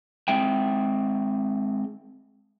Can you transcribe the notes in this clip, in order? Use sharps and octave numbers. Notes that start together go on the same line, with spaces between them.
G#3 C4 E5 G5